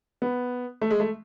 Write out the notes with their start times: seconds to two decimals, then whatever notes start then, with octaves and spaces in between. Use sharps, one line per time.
0.22 B3
0.81 A3
0.91 G#3
1.00 A3